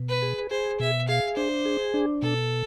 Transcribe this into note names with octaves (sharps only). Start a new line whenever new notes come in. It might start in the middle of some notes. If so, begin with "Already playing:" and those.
Already playing: B2
B4
G#4
G#4 C5
B2 E5
G#4 F5
D4 C5
G#4
D4
B2 A4